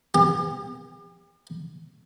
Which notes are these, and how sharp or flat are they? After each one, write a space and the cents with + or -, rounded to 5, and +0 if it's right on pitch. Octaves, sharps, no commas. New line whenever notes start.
G4 +45